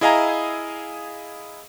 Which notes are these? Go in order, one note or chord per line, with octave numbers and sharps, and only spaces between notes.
E4 G#4 D#5 F5 G#5 A#5